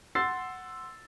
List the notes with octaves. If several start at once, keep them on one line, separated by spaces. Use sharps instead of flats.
F#5 C6 E6 A6 C7